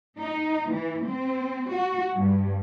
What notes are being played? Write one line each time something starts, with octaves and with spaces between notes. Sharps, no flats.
D#4
E3
C4
F#4
G2